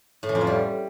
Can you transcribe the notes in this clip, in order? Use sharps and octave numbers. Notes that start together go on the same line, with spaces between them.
A2
E3
F2
F3
G3